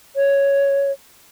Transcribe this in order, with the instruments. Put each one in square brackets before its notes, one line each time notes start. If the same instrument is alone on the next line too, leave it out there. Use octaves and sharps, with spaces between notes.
[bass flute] C#5